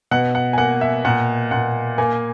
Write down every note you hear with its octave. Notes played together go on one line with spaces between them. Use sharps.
B2 F#5
F#5
G#5
A#3 F#5
E5
A#2 F#5
A#2 F#5
A#3 G#5